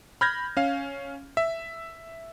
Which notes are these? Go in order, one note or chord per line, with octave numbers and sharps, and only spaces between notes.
B5 F6 G6 G#6 A#6
C#4 F5
E5